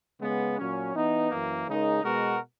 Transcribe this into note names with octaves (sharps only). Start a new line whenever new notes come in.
C#3 G#3 B3
A#2 F#3 C#4
E3 B3 D#4
F#2 E3 A#3
C#3 G#3 D#4 A#4
B2 G#3 B3 F#4 A#4